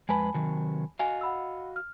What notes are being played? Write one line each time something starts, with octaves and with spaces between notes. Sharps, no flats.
F2 G#3 B4 G#5 A5 B5
C3 D#3 F#3
F#4 D#5 F5 G#5
F#5 B5 E6
F6